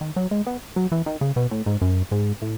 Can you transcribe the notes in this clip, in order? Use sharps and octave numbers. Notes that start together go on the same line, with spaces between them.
D#3
F#3
G#3
B3
F#3
E3
D#3
C#3
B2
A2
G#2
F#2
G#2
A2